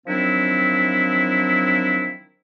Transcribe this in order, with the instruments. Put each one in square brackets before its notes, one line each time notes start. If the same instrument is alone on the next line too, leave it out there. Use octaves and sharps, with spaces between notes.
[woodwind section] D#3 F3 F#3 C4 D4 E4